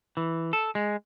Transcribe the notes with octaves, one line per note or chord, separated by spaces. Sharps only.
E3
A4
G#3